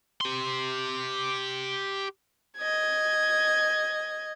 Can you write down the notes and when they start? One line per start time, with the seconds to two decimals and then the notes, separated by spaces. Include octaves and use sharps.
0.21 G4 C6
2.58 D#5 G#6